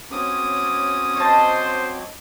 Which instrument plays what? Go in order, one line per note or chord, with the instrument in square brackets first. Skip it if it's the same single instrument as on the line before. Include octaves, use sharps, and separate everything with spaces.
[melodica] F#3 C4 D6 [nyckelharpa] C#4 D#6
[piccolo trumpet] C5 [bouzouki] D#5 A5